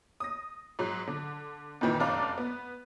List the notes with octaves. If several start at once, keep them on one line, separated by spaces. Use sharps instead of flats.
D#6 A#6
G#2 F#3
D3
F2 A#2 D#3 E3
F1 F#2 D4 F5 A#5 D6
B3